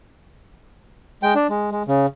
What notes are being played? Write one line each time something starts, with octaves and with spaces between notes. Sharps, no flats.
G#3 G5
D4
G#3
G#3
C#3